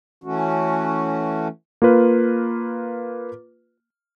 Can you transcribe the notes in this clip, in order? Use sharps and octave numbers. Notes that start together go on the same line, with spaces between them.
E3 A3 C#4 F#4
A#3 F4 B4